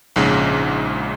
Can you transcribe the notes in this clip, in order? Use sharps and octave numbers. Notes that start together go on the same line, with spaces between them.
A#1 G#2 C#3